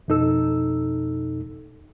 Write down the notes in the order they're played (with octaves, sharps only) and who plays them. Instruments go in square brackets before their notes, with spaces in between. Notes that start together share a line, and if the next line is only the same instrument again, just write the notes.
[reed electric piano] F2 B2 D#4 A4 E6